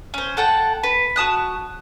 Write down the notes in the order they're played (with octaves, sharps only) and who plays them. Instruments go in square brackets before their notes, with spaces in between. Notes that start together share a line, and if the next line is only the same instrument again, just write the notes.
[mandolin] C#4 C5
A4 F#5 G5 A5
B4
F#4 A5 D#6 F#6